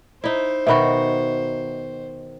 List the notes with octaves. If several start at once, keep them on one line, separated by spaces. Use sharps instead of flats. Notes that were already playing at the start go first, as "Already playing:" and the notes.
D#4 E4 C5
B2 D#3 F#4 E5 B5